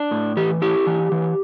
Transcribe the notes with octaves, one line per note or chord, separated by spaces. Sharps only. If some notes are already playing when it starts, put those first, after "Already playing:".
Already playing: D4
A2
E3 G4
E4 G4
E3
E3